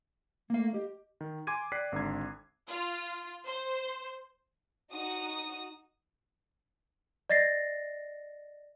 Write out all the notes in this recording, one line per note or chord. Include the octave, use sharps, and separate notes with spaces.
A3 A#3 F5
G4 D#5
D#3
G#5 C6 D6 G#6 D#7
D5 G5 F#6 B6 C7
G#1 D3 A4 A#5 G#6
F4
C5
D#4 F#4 D#6
D5 D#5 A6 A#6 C7